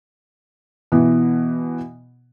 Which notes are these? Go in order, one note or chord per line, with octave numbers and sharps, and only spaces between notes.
B2 E3